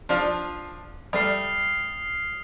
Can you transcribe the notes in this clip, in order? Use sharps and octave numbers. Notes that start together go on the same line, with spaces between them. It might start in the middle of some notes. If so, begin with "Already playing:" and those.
F3 D4 F4
G3 A3 D#6 F6 C7